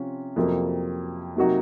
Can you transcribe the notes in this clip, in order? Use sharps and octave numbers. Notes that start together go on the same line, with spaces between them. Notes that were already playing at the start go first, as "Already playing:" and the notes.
Already playing: C3 F3 C#4 F4
F2 C3 F#3 A#3
C3 F#3 A#3 D#4 F#4